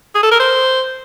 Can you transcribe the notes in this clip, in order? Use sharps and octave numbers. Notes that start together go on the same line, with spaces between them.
G#4
A4
A#4
C5